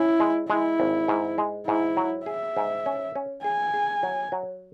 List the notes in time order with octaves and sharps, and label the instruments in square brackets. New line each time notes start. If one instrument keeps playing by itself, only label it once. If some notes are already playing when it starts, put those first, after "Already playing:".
Already playing: [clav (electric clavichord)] C#4 [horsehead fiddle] E4
[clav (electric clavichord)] G#3
[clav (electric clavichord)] G#3 [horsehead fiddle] E4
[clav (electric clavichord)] G#1
G#2
G#3
[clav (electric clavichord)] G#2 [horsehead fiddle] E4
[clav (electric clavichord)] F#3
[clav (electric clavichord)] G#4 [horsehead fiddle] E5
[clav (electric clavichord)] G#2
C#4
C#4
[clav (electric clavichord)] G#4 [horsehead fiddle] G#5
[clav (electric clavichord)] G#4
F#3
F#3